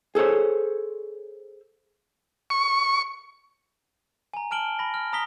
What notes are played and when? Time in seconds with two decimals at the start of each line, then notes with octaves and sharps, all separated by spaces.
0.15 G#4 A4 C5 C#5
2.50 C#6
4.34 G#5 A#5
4.51 A5 F6 D7 F#7 G7
4.79 B5 A#6
4.94 F6
5.13 A#5 D#6 A#6 B6 G7